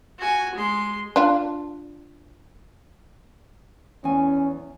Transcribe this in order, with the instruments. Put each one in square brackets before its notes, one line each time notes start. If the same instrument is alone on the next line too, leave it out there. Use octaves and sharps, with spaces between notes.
[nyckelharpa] F#4 G#5
G#3 C6
[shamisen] D4 F4
[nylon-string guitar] E2 G#5 [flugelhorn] C#4